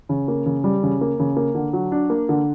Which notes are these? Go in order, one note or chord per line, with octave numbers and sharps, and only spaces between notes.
C#3
A#3
C#3
G3
C#3
A#3
C#3
A#3
D3
F#3
D4
A#3
D3